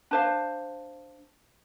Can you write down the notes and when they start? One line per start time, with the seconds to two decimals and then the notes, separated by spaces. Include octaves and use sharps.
0.11 D4 C5 F5